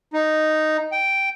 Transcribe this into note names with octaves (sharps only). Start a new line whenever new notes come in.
D#4
G5